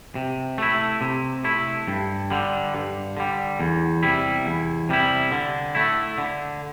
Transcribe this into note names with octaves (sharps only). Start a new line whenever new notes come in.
C3
A3 E4
C3
A3 E4
G2
D3 G3
G2
D3 G3
E2
C3 G3 E4
E2
C3 G3 E4
D3
A3 E4
D3